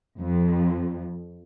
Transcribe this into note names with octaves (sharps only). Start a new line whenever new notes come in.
F2